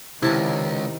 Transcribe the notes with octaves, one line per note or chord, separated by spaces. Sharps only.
C#2 C3 D#3 E4 A5